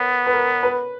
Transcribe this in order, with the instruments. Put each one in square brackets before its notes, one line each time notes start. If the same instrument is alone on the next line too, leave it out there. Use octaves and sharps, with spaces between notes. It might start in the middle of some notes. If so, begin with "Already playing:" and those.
Already playing: [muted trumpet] B3 [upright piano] A#4 C#5
[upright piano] B4
A#4
B4